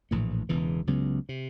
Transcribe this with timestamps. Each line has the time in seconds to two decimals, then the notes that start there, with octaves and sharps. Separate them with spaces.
0.11 A#1 A2 E3 A3
0.49 E1 E2 C#3 E3
0.87 C#2 C#3 F#3 B3
1.29 C3